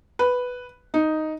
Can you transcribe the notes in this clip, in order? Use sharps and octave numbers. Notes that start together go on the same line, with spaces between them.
B4
D#4